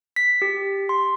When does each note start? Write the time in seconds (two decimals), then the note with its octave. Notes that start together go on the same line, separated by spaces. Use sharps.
0.16 B6
0.42 G4
0.89 C6